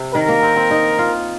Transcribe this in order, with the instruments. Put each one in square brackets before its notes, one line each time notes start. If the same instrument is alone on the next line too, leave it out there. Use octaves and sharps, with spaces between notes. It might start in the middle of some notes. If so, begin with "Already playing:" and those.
Already playing: [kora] C3
[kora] D#3 [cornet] A#4
[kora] A#3
C4
C4
D#4
F4